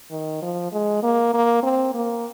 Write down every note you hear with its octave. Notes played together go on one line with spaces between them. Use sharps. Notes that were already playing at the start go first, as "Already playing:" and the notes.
D#3
F3
G#3
A#3
A#3
C4
A#3